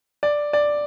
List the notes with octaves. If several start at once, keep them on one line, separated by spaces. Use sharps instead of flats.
D5
D5